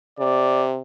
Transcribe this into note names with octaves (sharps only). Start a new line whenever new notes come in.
C3 D5